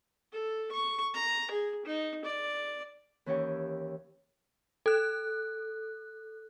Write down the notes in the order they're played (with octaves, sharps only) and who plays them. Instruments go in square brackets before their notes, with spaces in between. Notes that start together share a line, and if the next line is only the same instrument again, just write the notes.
[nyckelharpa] A4
C#6
A#5
G#4
D#4
D5
[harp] D#2 E3 C#4 G4 C#5 G5
[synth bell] A4 F#6